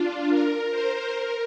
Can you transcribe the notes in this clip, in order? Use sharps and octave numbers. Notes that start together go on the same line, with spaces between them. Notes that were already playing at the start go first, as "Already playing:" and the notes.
Already playing: D4 F4
A#4
C5
A#4